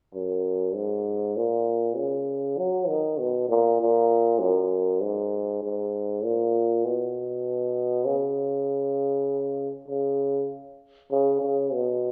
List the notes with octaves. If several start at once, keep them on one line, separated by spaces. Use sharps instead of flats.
F#2
G#2
A#2
C#3
F#3
D#3
B2
A#2
A#2
F#2
G#2
G#2
A#2
B2
C#3
C#3
C#3
C#3
B2